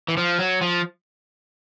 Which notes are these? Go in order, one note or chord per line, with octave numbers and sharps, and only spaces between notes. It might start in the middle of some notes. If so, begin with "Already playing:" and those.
E3
F3
F#3
F3